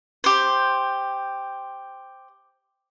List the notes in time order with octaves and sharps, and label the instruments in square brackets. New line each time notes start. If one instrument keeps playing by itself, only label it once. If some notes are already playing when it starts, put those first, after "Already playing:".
[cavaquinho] G4 C5